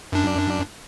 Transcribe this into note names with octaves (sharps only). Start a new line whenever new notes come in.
F#2 D4